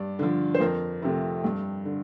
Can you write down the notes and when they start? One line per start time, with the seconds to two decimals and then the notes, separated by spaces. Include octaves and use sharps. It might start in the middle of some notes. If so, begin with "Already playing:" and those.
Already playing: G2 D5
0.19 D3 F3
0.55 C5
0.60 F2 A#4
1.02 C3 F3 A3
1.44 G2
1.85 D3